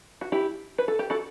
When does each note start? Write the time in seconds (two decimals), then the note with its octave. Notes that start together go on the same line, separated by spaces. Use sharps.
0.21 F#4
0.32 E4 G4
0.78 B4
0.88 A4
0.99 G4
1.10 F#4 A4